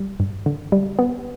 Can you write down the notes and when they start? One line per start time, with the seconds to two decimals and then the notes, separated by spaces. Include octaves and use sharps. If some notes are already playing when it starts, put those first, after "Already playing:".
Already playing: G3
0.20 G2
0.46 D3
0.72 G3
0.99 B3